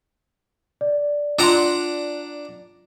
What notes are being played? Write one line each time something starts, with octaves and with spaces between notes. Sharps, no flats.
D5
D4 F4 F#5 A#5 C6